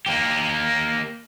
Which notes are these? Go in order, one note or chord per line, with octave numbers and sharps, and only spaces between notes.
A#3 G4